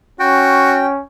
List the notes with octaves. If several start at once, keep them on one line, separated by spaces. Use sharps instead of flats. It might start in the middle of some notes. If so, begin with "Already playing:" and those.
C#4 F#4 G5